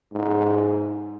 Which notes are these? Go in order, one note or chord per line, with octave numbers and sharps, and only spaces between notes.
G#2